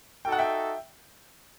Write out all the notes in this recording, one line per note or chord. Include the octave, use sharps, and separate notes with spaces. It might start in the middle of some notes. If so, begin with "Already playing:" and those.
D#4 F#4 A4 G5
F#5
E5 G5